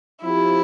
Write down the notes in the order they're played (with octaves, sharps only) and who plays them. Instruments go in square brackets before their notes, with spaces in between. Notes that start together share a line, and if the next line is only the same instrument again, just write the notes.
[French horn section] F3 C4 G4 [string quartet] E4